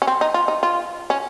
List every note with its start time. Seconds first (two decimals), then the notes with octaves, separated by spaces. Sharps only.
0.02 C#4
0.07 C4
0.21 D#4
0.34 F4
0.48 D#4
0.63 F4
1.10 C#4